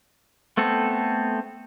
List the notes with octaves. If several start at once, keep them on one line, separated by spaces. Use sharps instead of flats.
A3 B3 C4 A4